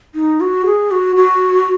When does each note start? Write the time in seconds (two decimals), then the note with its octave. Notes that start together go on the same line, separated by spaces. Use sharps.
0.15 D#4
0.41 F#4
0.66 G#4
0.91 F#4
1.16 F#4